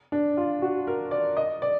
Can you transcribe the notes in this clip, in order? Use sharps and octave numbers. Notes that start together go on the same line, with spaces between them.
D4
F4
F#4
A#4
D5
D#5
D5